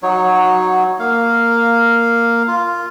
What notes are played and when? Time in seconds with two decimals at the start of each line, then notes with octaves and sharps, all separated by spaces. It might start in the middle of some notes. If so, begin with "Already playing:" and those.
0.03 F#3 D#4 C#5
0.99 A#3 F5
2.48 F4